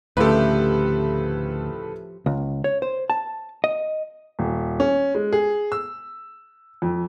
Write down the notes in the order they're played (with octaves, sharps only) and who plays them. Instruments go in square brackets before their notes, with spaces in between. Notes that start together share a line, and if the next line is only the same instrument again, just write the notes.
[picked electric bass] D2 [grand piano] A2 C#3 A3 [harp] F3 G4 [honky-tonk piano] A4 B4
[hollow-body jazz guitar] C#2
C#5
C5
A5
D#5
[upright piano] D#1
C#4
G#3
G#4
E6
F2